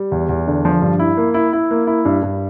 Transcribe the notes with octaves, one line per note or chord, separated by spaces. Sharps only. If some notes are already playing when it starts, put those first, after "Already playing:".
Already playing: G3
E2
E2
D3
F3
G2
E4
A#3
E4
E4
A#3
E4
G2
G2